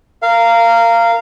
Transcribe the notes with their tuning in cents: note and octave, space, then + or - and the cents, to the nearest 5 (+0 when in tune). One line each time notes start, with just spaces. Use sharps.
A#4 -15 F5 -15